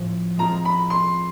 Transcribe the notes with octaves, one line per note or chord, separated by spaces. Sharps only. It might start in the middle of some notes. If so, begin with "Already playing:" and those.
Already playing: A2 F3 A#3 C#4
G#3 C4 F4 G#4 A#5
B5
C6